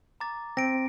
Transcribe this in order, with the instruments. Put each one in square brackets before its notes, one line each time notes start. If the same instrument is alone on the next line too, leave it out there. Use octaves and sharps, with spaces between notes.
[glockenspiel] A#5 D6 A6
[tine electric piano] C4 [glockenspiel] A#6 D7